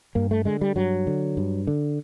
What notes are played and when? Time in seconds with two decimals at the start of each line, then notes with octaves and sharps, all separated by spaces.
0.15 G2 A#3
0.31 A3
0.45 D3 G#3
0.61 G3
0.76 G2 F#3
1.07 D3
1.37 G2
1.67 D3